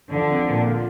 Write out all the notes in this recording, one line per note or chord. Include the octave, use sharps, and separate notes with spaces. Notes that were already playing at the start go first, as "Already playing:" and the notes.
D3 F3
C4
A#2
F4